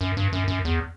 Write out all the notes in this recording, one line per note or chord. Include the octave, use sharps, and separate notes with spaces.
F#2
G2
F#2
F#2
E2